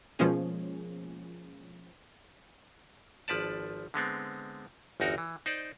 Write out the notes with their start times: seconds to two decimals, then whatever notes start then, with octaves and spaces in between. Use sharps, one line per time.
0.19 B2 F3 G#3 A#3 C#4 G#4
3.28 G#1 F3 B4 D5 A5
3.94 D3 G#3 B3 C4
5.00 G1 E2 D#4 F#4 A#4
5.18 E3
5.46 D#4 C5 D5